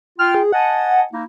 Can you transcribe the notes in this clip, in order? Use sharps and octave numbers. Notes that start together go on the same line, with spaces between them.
F4 G5 F6
G#4
D#5 F#5 G#5 A5
A#3 D#4 E4